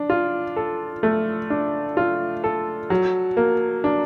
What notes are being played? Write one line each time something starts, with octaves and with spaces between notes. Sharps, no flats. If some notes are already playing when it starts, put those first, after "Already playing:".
Already playing: D4
F4
A4
A3
D4
F4
A4
F#3
A#3
D4